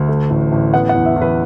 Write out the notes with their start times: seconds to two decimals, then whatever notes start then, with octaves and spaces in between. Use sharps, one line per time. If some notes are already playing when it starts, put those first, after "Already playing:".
Already playing: D2
0.09 A3
0.30 A1
0.52 A1
0.74 B3 F#5
0.89 F#5
0.95 E2
1.06 E5
1.16 E2
1.21 B4